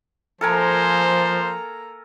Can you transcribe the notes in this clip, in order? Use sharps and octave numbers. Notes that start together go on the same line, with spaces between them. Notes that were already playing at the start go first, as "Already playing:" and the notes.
F3 A#3 A4 A#4 C5 G#5 A#5